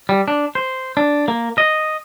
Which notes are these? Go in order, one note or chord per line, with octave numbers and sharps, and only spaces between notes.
G3
D4
C5
D4
A#3
D#5